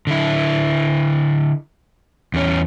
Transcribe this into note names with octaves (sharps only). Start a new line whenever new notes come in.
D3 E4
E2 C#4